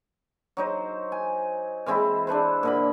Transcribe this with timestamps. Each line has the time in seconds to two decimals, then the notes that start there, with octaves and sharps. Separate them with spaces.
0.57 F#3 D#4 C5
1.12 G#5
1.86 E3 G#3 C4 E4
2.27 D4 A4 B4 C5
2.63 A#2 D3 B5